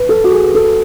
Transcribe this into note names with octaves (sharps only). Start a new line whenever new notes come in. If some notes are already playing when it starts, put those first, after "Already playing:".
Already playing: B4
A4
F#4
G#4
A4